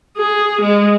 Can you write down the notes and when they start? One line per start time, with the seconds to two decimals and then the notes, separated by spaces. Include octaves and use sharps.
0.17 G#4
0.62 G#3